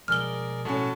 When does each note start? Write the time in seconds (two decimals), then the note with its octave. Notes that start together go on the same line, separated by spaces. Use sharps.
0.08 B2 F3 G#3 G#4 A#4 D5 F6 G7
0.65 A2 C#4 F#4 A5